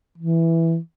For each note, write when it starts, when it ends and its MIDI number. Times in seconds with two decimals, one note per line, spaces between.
0.18 0.77 52